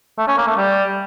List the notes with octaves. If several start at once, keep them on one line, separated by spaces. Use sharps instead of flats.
A3
C#4
A#3
A3
G3